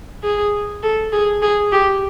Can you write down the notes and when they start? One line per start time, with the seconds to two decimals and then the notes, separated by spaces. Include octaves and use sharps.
0.23 G#4
0.83 A4
1.12 G#4
1.42 G#4
1.72 G4